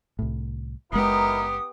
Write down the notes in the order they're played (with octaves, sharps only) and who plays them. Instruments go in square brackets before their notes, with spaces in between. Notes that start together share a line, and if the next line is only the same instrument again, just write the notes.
[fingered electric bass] C2 A2
[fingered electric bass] F#1 G#3 [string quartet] B3 G4 [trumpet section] D#4 E4 A#4 [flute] D#6